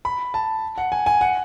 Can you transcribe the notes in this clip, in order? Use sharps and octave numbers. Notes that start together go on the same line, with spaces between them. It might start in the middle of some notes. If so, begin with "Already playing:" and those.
B5
A5
F#5
G#5
G#5
F#5